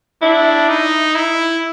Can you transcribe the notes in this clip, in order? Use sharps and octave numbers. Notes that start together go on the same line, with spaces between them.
D4 E4
D#4
E4